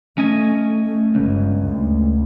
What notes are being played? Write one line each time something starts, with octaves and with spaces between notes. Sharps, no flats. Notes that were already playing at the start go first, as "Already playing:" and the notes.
A3 C#4 D#5 G#5
A3
G1 C#2
D2